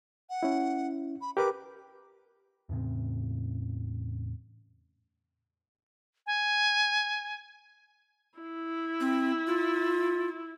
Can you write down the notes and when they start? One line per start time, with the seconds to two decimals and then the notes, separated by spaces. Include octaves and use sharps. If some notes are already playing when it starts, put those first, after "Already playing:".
0.30 F#5
0.43 C#4 E4
1.21 B5
1.37 G4 A#4 B4 D6
2.69 E2 A2 C#3 C4
6.27 G#5
8.38 E4
9.00 C4
9.47 F4